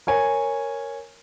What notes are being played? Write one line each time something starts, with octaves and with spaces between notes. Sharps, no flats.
A#4 C#5 G#5